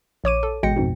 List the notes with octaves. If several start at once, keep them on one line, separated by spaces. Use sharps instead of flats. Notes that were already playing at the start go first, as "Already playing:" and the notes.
A#1 C#5 D6 D#7
A4
A1 B2 G#3 G5 A#6 C#7
F2 G#2 B2